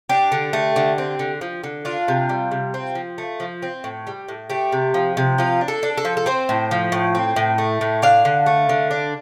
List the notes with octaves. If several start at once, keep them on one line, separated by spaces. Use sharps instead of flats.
D4 G4
D3
A3
D3
C4
D3
F3
D3
D4 F4
C3
G3
C3
C4
F3
A3
F3
C4
A2
G3
A2
A3 G4
C3
F3
C3
F3 F4
D4
A4
D4
A4
F3
A4
C4 C5
A2
F3
A2
C4
A2
A3
A2
D4 F5
D3
A3
D3
D4